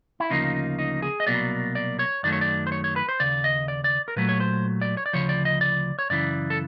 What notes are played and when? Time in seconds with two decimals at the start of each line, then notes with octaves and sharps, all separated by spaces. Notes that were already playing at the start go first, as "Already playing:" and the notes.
0.20 E4
0.30 D2 C#3 F3 A#3 D#4
0.79 D#4
1.02 G#4
1.20 D#5
1.27 C2 B2 F#3 A#3 D5
1.75 D5
1.99 C#5
2.23 F#2 D#3 F#3 A3 D5
2.32 C#5
2.41 D5
2.67 C5
2.72 C#5
2.84 C#5
2.96 B4
3.09 C5
3.20 D#2 C#3 D5
3.44 D#5
3.68 D5
3.84 D5
4.08 A#4
4.16 A#2 F#3 A3 B4
4.29 C#5
4.40 C5
4.81 D5
4.97 C#5
5.06 D5
5.13 D2 C#3 F3 C#5
5.29 D5
5.45 D#5
5.61 D5
5.99 C#5
6.10 F#2 C#3 E3 D5
6.50 A4